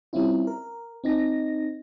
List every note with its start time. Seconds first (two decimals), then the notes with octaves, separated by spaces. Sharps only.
0.13 G3 C4 C#4 E4 F4
0.47 A#4
1.04 C4 D#4 A#6